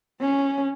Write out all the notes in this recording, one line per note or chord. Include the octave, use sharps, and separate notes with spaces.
C#4